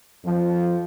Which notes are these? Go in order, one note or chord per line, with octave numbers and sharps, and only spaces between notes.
F2 F3